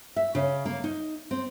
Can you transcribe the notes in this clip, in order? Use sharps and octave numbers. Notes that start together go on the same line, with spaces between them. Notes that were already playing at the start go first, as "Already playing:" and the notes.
E5
C#3
A#3
D#4
C4